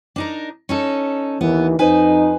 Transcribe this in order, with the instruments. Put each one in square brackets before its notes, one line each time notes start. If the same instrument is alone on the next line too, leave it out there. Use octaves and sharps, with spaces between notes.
[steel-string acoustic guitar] D4 D#4 A#4
C#4 D#4 A4
[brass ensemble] D#2 E3 [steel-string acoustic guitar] B3
[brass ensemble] F2 D#4 [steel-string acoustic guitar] B4 C5 G#5